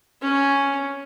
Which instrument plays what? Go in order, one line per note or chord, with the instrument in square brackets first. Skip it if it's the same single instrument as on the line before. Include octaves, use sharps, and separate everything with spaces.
[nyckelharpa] C#4